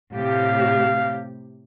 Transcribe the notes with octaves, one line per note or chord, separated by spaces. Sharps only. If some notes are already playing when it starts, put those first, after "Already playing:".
A2 C3 G4 F5